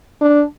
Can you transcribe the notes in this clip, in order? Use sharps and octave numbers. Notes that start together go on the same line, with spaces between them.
D4